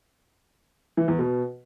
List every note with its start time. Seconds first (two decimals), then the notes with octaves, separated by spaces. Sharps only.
0.97 E3
1.08 E2
1.19 B2